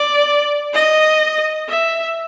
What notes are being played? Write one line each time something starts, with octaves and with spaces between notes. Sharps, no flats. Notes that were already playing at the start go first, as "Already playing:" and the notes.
Already playing: D5
D#5
E5